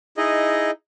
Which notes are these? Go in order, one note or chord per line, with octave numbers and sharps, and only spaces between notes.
D#4 E4 G#4 D#5